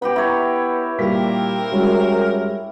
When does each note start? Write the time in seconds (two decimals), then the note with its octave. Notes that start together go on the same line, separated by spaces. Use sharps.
0.02 B3 G4 D#5 B5
0.16 E4 C#5 A#5
0.99 A#2 G3 A#3 C4 A#4 B6
1.72 F#2 G3 G#3 F#4